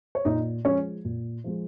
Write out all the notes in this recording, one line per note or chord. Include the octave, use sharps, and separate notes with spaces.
C#5
A#2 D#4 D#5
F3 G#3 C#4 C#5
A#2
F3 G#3